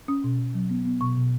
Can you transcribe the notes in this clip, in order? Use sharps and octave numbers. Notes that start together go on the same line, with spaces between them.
C#4 D#6
B2
B2
F#3
B3
B3
B2 C#6
B2